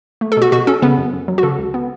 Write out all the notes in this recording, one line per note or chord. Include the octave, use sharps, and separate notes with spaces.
A3
A4
B2 F#4
B2 F#4
C#4 A4
C#3 B3 B4
F#2
F#2
F#3
F#4
C#3 A4
C#2
B3